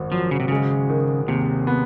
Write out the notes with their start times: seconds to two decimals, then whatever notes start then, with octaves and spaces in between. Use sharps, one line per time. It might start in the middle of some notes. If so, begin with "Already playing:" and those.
Already playing: G#1 F#2
0.11 F3 F#3
0.31 C#3
0.40 C3
0.48 C#3 G#3
0.89 D#3
1.28 D#2 C3
1.67 B3